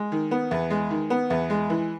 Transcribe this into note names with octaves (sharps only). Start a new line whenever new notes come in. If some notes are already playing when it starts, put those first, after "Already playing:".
Already playing: G#3
D#3
B3
E2
G#3
D#3
B3
E2
G#3
E3